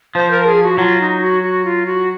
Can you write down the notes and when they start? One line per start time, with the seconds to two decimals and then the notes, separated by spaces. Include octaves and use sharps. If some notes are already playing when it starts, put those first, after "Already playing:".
0.15 F3 C5
0.31 A#4
0.46 G#4
0.63 F#4
0.78 F#3 F4
1.01 D#4
1.21 F#4
1.43 F#4
1.65 F4
1.86 F#4